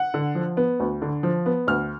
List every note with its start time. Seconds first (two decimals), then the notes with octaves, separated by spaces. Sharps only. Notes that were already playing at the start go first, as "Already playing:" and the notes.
Already playing: F#5
0.14 D3
0.35 F3
0.57 B3
0.80 D2
1.02 D3
1.23 F3
1.46 B3
1.68 D2 F6